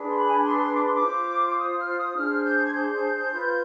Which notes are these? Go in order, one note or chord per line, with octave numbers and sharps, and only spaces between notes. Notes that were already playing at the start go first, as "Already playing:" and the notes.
Already playing: D4 G#4 B4
C6
B5
G#5
B5
C6
D6
C6
D6
F4 C5
D6
D#6
F6
D#6
D4 G#4 C5 F6
G6
G#6
G6
F4 B4